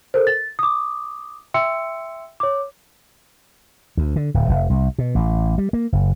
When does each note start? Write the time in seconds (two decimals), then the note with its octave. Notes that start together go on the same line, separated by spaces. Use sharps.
0.14 A4 A#4 C5
0.27 A6
0.59 D6 D#6
1.54 E5 G5 C6 E6 C#7
2.40 C#5 D6
3.97 D2
4.16 D3
4.34 D1
4.49 F1
4.70 C2
4.98 B2
5.15 A1
5.58 G3
5.73 A#3
5.92 F#1